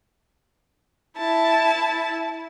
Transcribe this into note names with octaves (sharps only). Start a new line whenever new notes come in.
E4 A5